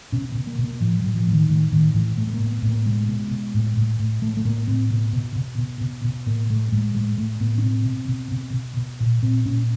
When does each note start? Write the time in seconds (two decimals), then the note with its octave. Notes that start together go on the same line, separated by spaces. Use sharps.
0.12 B2 C#4
0.30 B3
0.35 B2
0.47 A#3
0.58 B2
0.64 A#3
0.80 A2 F3
0.98 F#3
1.04 A2
1.15 F3
1.27 A2 D#3
1.48 A2 D#3
1.72 A2 D#3
1.95 A2 E3
2.17 A2 A3
2.27 A3
2.34 A#3
2.39 A2
2.52 B3
2.62 A2
2.69 A#3
2.86 B2 G#3
3.09 B2
3.31 B2
3.54 A2
3.77 A2
4.00 A2
4.22 A2 A3
4.37 A3
4.45 A2 A#3
4.67 A2 C4
4.90 B2 B3
5.13 B2
5.36 B2
5.58 B2
5.81 B2
6.04 B2
6.26 A2 A#3
6.50 A2 A3
6.72 A2 G#3
6.95 A2 G#3
7.18 A2 A3
7.40 A2 B3
7.58 C#4
7.63 B2 C4
7.85 B2
8.08 B2
8.31 B2
8.54 B2
8.77 B2
9.00 A#2
9.23 A#2 C4
9.45 A#2 C#4